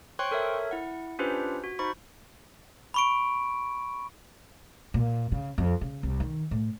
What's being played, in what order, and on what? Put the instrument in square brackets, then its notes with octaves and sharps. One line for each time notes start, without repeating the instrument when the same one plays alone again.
[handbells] C5 C#5 G5 C6 C#6 F#6
A4 A#4 C#5 E5
E4 F#5
C#4 D4 F4 G4 B4 C5
F#4
D#4 C5 B5 C#6
[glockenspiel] B5 C#6 D7
[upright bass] A#2
C#3
F2
C#3
C2
D#3
A2